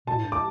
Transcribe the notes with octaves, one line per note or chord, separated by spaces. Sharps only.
B2 A5
A2
G2
D6